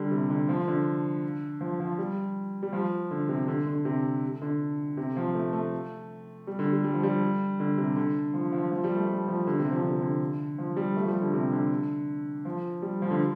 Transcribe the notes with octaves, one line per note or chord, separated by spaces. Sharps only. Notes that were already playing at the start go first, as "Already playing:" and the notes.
Already playing: D3 G3
C3
D3
F3
D3
F3
F3
G3
G3
F3
D3
C3
D3
D3
C3
D3
C3
F3
A3
A3
G3
D3
G3
G3
F3
G3
D3
C3
D3
F3
F3
F3
G3
A3
G3
F3
D3
C3
F3
D3
C3
D3
F3
G3
A3
F3
G3
D3
C3
D3
F3
G3
F3
D3